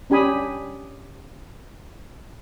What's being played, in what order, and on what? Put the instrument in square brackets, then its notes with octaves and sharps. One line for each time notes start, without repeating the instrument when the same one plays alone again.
[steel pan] C#4 D4 G4 G#5 B5 D#6